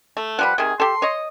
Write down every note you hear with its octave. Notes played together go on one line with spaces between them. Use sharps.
A3
F3 G3 B4 F#5
C3 D#3 G#4
G4 A4 C6
C#5 D#5